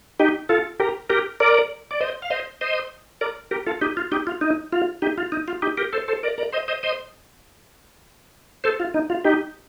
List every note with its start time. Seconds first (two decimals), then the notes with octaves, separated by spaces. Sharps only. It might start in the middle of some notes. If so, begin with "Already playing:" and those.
0.20 D#4 G4
0.49 F4 A4
0.80 G4 A#4
1.10 G4 A#4
1.40 A#4 D5
1.91 D5
2.01 C5 D#5
2.22 F5
2.30 C5 D#5
2.61 C5 D#5
3.21 A#4 D5
3.51 G4 A#4
3.66 F4 A4
3.81 D#4 G4
3.97 F4
4.12 D#4 G4
4.27 F4
4.41 D#4
4.72 F4
5.02 D#4 G4
5.18 F4
5.32 D#4
5.48 F4
5.62 D#4 G4
5.77 G4 A#4
5.93 A4 C5
6.08 A4 C5
6.23 A#4 D5
6.38 A#4 D5
6.53 C5 D#5
6.68 C5 D#5
6.83 C5 D#5
8.64 A4 C5
8.80 F4
8.94 D#4
9.10 F4
9.24 D#4 G4